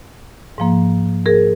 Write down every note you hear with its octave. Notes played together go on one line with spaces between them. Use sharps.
G#2 F3 A#3
G#4 A#4